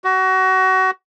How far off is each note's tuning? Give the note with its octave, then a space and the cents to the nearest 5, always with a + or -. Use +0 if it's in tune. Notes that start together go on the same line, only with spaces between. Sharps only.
F#4 +25